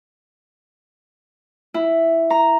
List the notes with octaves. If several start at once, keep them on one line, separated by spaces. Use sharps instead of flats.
E4
A#5